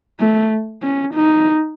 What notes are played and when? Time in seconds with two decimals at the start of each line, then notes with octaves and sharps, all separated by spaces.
0.20 A3
0.83 C#4
1.14 D#4